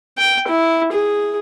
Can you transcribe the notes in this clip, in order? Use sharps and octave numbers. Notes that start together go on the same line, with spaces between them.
G5
E4
G#4